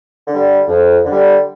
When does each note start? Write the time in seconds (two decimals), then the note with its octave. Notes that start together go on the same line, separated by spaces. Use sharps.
0.28 D3 G3
0.67 F2
1.05 D3 G3